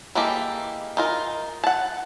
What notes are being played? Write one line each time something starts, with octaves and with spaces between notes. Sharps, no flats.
E3 G#3 A#3 G4 A4
D#4 F4 A#4
F#5 A5